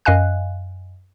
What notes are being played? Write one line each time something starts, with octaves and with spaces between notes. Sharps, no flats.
F#2 D#5 F5 G#5 F#6